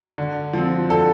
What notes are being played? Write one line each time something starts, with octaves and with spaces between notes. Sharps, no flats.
D3
F3 C4
D3 A4